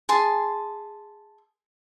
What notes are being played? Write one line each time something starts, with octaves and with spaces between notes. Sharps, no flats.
G#4 A5 C6